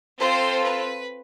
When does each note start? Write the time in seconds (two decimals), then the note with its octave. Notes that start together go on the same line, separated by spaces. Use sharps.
0.19 C4 F4 A4 C5
0.63 B4